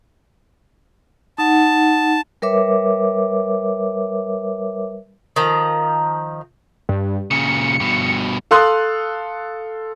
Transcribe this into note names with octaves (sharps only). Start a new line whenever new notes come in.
D#4 F#5 A5
G3 A#4 B4 C#5 E5 D6
D#3 F3 A#5
G2
A#2 C#3 C#7
G2 B2
A4 F5 C6 D#6 F#6